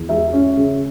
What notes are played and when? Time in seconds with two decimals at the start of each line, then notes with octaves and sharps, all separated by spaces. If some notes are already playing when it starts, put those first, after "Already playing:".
Already playing: E2
0.09 G#3 E5
0.33 C#4
0.57 C#3